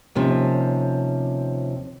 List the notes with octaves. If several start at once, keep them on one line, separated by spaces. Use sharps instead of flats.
D#2 C3 F3 C#4